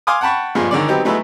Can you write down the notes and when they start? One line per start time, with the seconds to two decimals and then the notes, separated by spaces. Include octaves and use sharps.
0.07 F5 G#5 C6 D6 D#6
0.21 F#5 G5 A5 B5 C#6
0.55 G2 A#2 F3 G#3
0.71 D3 D#3 G#3 C#5 D5
0.88 F#3 G3 B3 C4 D#4 G4
1.05 F#3 G#3 A3 B3 D#4 E4